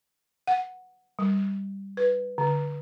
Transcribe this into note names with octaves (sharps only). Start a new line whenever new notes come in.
F#5
G3
B4
D3